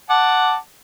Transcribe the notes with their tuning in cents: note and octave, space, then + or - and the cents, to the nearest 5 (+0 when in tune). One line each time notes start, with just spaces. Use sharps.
F#5 +0 A5 +0 D6 +0